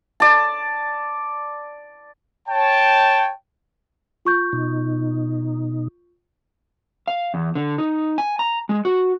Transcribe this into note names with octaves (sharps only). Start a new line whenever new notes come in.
D5 A5
C#5 G5 A5
F4 C#6 G6
B2 D#4
F5
E2
D3
D#4
G#5
A#5
G#3
F#4